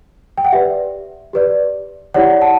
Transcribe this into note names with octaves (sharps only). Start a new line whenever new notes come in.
G5
F#5
G4 B4 D5 E5
G4 B4 D5
E4 G4 C#5 D5 F#5
F#5 A5